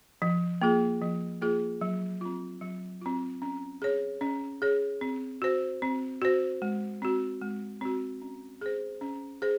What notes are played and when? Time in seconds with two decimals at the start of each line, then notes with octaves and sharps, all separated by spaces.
0.22 F3
0.62 A#3 F4 G#4
1.02 F3
1.42 A#3 F4 G#4
1.81 F#3
2.21 C4 F4
2.61 F#3
3.02 C4 F4
3.42 C#4
3.82 G#4 C#5
4.21 C#4
4.62 G#4 C#5
5.01 C4
5.42 F#4 C5
5.82 C4
6.22 F#4 C5
6.62 G#3
7.02 C4 F#4
7.41 G#3
7.81 C4 F#4
8.22 C#4
8.61 G#4 C5
9.01 C#4
9.42 G#4 C5